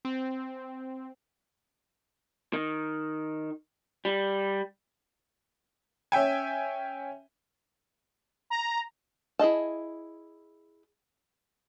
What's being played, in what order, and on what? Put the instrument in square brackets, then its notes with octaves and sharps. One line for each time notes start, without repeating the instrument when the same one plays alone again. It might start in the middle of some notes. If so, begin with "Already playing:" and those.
[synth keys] C4
[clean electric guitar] D#3
G3
[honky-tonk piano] C#4 E5 G5 G#5
[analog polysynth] A#5
[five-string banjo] E4 G#4 D#5 A5